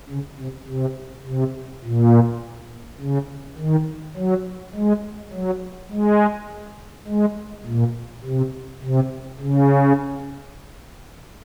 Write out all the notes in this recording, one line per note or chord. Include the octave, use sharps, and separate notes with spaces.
C#3
C3
C3
C3
A#2
C#3
D#3
F#3
G#3
F#3
G#3
G#3
A#2
C3
C3
C#3